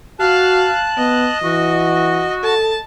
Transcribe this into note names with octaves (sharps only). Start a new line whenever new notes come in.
F#4 F5 A5 F#6
B3 D#5
E3 F#4
A4 A5